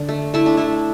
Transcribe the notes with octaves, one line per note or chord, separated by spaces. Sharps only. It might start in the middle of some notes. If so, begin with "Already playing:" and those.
Already playing: D3
A3
A3 E4
D4
A3 E4